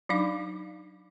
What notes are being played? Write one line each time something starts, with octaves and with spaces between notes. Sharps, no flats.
F#3 D4 D#4 F5 D6